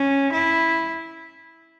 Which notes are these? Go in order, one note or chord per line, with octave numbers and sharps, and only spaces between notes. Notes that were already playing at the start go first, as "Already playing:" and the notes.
Already playing: C#4
E4